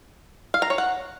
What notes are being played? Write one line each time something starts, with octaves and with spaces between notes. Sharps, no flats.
F5
A#5
C#5
F#5